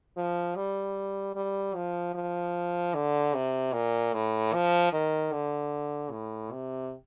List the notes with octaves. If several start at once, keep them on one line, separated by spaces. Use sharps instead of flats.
F3
G3
G3
F3
F3
D3
C3
A#2
A2
F3
D#3
D3
A2
C3